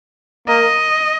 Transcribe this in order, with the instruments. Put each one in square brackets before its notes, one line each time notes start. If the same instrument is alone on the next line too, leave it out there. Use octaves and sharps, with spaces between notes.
[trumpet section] A#3 A#4 [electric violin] D#5